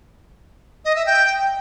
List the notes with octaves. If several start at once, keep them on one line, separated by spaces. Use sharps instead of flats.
D#5
E5
G5